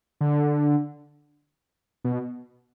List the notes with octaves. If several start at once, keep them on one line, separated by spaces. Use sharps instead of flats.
D3
B2